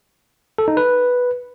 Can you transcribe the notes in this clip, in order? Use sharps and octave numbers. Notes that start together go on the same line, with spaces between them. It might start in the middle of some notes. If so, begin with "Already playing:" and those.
A4
D#4
B4